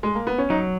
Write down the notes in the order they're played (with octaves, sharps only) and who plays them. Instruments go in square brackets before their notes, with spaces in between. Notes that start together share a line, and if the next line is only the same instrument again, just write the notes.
[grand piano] G#3
A#3
B3
C#4
[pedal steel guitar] F#3 [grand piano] D#4